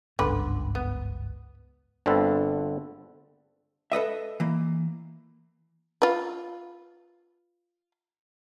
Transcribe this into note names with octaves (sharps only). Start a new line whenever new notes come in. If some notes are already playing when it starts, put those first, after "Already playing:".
G1 C#2 G#2 D3 B4
B3
G1 D3 C4 F4 A4 B4
A4 B4 D#5 E5
E3 A#3
F4 B4